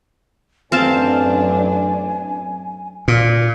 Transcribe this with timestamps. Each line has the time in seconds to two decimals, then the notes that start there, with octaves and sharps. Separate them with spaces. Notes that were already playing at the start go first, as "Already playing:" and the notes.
0.72 A1 F#2 C4 D4 F5 G#5 A5
3.08 A#2